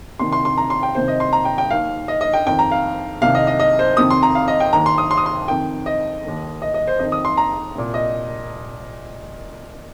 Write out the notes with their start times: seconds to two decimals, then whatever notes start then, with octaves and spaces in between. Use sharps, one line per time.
0.19 C2 C3 D#3 C6
0.33 C6
0.45 C6
0.58 A#5
0.70 C6
0.83 G5
0.95 C2 C3 D#3 C5
1.08 D#5
1.20 C6
1.33 A#5
1.45 G5
1.58 G5
1.71 D#2 D#3 F5
2.08 D#5
2.21 D#5
2.33 G5
2.46 F2 D#3 G5
2.59 A#5
2.72 F5
3.22 C2 C3 D#3 F5
3.35 D#5
3.47 D#5
3.59 D#5
3.79 C5
3.97 F2 C3 D#3 D#6
4.11 C6
4.23 A#5
4.35 F5
4.48 D#5
4.60 G5
4.73 D#2 D#3 A#5
4.86 C6
4.98 D#6
5.11 C6
5.18 D#6
5.26 C6
5.48 F2 D#3 G5
5.86 D#5
6.25 D#2 D#3
6.62 D#5
6.74 D#5
6.88 C5
6.99 F2 D#3 D#5
7.12 D#6
7.25 C6
7.37 A#5
7.75 C2 A#2
7.94 D#5